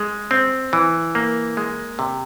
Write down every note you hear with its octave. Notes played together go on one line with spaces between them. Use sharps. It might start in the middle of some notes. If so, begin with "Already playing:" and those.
Already playing: G#3
C4
E3
A#3
G#3
C3